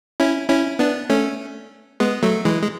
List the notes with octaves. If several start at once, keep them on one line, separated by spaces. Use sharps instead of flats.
C#4 E4
C#4 E4
B3 D4
A3 C#4
G#3 B3
F#3 A3
E3 G#3
G#3